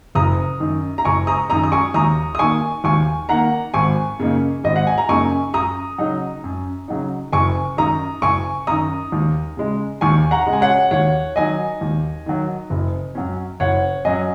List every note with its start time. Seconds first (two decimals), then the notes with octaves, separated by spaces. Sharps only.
0.15 F#1 A#5 D#6
0.60 F#2 D#3
0.98 A#5
1.05 F#1 G#5 C#6
1.27 A#5 D#6
1.50 F#2 D#3 A#5 D#6
1.63 D#6
1.72 G#5 C#6
1.94 D#2 A#5 D#6
2.35 D#6
2.39 D#3 A#3 G#5 C#6
2.84 D#2 G#5 C#6
3.29 D#3 A#3 F#5 A#5
3.74 G#1 G#5 C#6
4.19 F#2 C#3 A#3 D#4
4.64 G#1 D#5
4.76 F#5
4.87 G#5
4.98 A#5
5.09 F#2 C#3 A#3 D#4 G#5 C#6
5.53 F#2 A#5 D#6
5.98 C#3 F#3 D#4
6.44 F#2
6.88 C#3 F#3 D#4
7.33 F#1 G#5 C#6
7.77 F#2 D#3 A#5 D#6
8.22 F#1 G#5 C#6
8.67 F#2 D#3 A#5 D#6
9.12 D#2
9.57 C#3 G#3
10.01 D#2 G#5 C#6
10.31 F#5 A#5
10.46 C#3 G#3
10.53 G#5
10.61 C#5 F#5
10.91 D#2 C#5 F#5
11.36 D#3 F#3 D#5 G#5
11.81 D#2
12.26 D#3 F#3
12.70 F#1
13.15 F#2 F#3 C#4
13.60 F#1 C#5 F#5
14.05 F#2 F#3 C#4 D#5 G#5